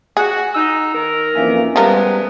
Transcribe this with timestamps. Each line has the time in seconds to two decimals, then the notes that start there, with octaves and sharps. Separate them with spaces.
0.17 F#4 G#4 F#5
0.54 D#4 E6
0.94 D#3 A#4
1.35 F2 E3 A#3 C#4 E5 G#5
1.76 F3 G3 G#3 B3 A#4